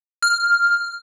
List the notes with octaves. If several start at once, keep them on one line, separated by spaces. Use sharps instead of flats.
F6